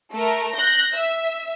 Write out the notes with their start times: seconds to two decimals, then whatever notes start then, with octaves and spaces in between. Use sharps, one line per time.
0.12 A3 A#4
0.54 F#6 G6 A#6
0.93 E5